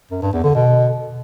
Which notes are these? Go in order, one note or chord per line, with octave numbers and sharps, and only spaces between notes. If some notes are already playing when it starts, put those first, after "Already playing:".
F#2
G2
E2
D3
B2